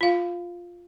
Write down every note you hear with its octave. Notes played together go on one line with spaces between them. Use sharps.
F4 F5